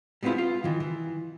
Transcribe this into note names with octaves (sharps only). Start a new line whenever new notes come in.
G3 G#3 B3 C4 E4 F4
F4
D#3 E3
E3